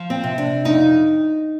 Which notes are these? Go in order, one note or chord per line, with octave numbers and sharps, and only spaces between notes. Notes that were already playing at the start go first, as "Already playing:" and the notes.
Already playing: F3
C4
C3
D4
F2 D#4